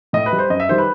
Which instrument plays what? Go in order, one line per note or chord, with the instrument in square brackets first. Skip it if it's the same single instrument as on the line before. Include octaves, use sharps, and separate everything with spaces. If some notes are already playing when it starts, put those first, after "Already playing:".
[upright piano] A2 D#5
B4
G3
C5
F#2 D#5
E5
D#3 G3 C5
B4